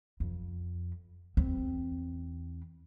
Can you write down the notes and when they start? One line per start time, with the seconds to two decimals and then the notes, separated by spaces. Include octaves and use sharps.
0.20 F2
1.37 E2 C4